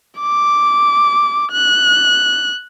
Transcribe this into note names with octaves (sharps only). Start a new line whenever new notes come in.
D6
F#6